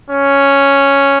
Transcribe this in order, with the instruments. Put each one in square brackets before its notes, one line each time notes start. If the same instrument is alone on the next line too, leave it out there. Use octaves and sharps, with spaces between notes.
[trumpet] C#4